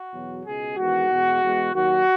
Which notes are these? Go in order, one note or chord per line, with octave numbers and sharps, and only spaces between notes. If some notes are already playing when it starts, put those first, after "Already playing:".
Already playing: F#4
E2 B2 F#3
C#2 B2 G#3 G#4
E2 D#3 G#3 F#4
E2 B2 G#3
E2 B2 G#3
D#2 D#3 F#3 F#4